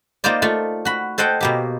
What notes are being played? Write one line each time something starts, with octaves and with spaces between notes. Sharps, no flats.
A#3 D#4 F4 C5 D5
A3 F4
F#4 B5
A4 C5 D#5 F#5 G5
B2 A#3 G4